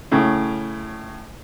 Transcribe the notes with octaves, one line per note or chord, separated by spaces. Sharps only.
A2 C#3